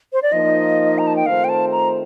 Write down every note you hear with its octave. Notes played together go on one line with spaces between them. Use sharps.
C5
D5
F3 A#3 D#4 D#5
A#5
A5
G5
D#3 A3 C4 F4 C5 F5
G5
A5
A#5